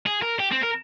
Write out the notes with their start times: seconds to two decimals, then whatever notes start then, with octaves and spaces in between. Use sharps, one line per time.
0.07 G#4
0.22 A#4
0.40 G4
0.52 C4
0.63 A#4